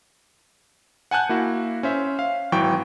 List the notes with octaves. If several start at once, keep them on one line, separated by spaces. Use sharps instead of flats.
F#5 G#5 A5 F#6 G6
A#3 E4 F#4
C#4 C5 E5
F5
G#1 E3 F#3 G5 C#6